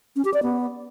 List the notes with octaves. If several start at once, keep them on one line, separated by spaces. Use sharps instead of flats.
C#4
G4
D5
B3